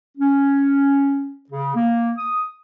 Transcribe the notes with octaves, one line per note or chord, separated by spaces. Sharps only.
C#4
C#3
A#3
D#6